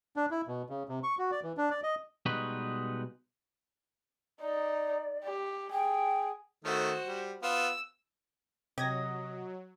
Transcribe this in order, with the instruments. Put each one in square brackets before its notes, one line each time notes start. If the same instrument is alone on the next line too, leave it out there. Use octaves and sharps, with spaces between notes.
[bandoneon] D4
E4
B2
C#3
C3
C#6
F#4
D5
E3
D4
D5
D#5
[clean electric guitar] B2 G3 G#3 D#4 F#4 B4
[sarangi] D#4 [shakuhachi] D5
[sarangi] G4
[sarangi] G#4 [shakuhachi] G5
[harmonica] D#3 A3 [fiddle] F#4 C5
[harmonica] G3
[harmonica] B3 F4 [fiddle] E6
[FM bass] C3 [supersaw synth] F#3 [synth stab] G4 G#6 A#6 [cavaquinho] D#5